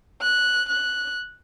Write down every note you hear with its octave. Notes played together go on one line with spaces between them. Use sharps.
F#6
F#6